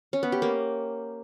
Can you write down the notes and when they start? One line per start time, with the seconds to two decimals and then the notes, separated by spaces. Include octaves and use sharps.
0.13 C#4
0.23 B3
0.32 G4
0.42 A#3